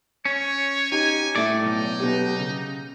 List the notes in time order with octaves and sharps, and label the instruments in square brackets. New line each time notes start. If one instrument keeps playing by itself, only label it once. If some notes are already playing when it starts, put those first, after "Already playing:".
[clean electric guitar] C#4 [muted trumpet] C#5
[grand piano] D#4 G4 [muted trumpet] G#5
[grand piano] A2 A3 [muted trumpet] A4 [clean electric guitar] D5
[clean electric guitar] B1 [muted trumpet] D#4
[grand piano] B2 G4
C#3